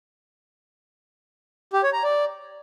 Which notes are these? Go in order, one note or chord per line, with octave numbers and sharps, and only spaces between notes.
G4
C#5
A#5
D5